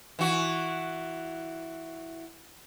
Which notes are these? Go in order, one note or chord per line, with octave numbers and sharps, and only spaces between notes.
E3 F#4